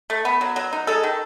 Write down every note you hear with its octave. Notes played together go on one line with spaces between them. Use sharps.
A3
B3
F#3
F#3
D#4
G#3 A4
D#3